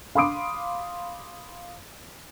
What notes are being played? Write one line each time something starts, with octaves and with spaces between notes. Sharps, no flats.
F5 B5 C6 D6 D#6 D7